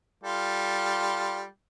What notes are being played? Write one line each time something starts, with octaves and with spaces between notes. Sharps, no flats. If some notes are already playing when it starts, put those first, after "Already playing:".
G3 F4 A4